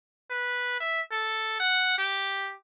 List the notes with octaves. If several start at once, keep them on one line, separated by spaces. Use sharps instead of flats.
B4
E5
A4
F#5
G4